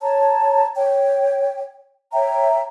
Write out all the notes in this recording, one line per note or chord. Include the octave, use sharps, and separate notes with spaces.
C#5 A5 A#5
C#5 G5
C#5 E5 G5 A#5